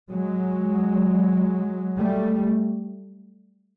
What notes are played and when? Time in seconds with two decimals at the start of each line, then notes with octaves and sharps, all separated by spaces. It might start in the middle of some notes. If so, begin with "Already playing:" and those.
0.12 F#3 G#3
1.98 G3 A3